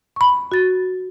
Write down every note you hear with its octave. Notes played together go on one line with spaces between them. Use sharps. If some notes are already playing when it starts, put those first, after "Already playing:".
B5 C#6
F#4 A6